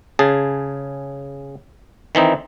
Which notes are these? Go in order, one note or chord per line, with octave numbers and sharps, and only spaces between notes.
C#3 G#4 A5
D#3 E3 C4 D#4